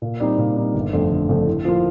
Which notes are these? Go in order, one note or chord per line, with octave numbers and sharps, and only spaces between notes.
A#2
G3 C4 D#4
A#2
G3 C4 D#4
G1
F2 D3 A3
G1
F2 D3 A3
A2
F3 A#3 F4